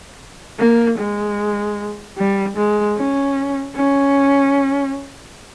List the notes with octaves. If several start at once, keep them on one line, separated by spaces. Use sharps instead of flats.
A#3
G#3
G3
G#3
C#4
C#4